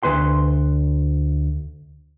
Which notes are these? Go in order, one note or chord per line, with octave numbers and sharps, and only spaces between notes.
D2 B4 C6